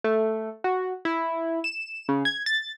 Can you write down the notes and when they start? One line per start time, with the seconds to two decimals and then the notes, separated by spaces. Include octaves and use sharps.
0.04 A3
0.64 F#4
1.05 E4
1.64 E7
2.09 C#3
2.25 G#6
2.46 A6